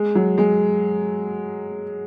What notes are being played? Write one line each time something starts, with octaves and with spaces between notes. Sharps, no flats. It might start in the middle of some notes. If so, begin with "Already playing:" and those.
Already playing: G#3
F#3
G#3